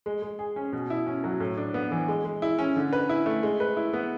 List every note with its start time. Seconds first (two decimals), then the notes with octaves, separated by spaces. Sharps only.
0.06 G#3
0.22 G#3
0.39 G#4
0.56 C#4
0.73 B2
0.90 E4
1.07 C#4
1.24 F#3
1.40 A2
1.57 D4
1.74 B3
1.91 E3
2.08 G#3
2.25 G#3
2.42 E4
2.59 C#4
2.76 D3
2.93 B4
3.09 E4
3.26 A3
3.43 G#3
3.60 B4
3.77 E4
3.93 B3